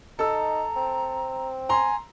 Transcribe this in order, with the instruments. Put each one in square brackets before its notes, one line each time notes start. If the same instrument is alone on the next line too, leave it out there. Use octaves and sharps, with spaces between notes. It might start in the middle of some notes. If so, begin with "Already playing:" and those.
[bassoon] D#4 [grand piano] A4 E6 [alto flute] A#5
[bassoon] C4
[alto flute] G#5 [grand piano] A#5 C6